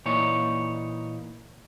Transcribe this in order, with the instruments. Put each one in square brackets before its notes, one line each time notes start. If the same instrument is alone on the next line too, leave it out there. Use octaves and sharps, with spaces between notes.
[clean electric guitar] A#2 E3 D#4 C#5